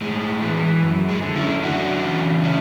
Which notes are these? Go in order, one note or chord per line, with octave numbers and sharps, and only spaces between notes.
A2 G#3
E3
F#2
G#3
D3
C#4 E4
F#2 D4 F#4
C#3 E3
C#4 E4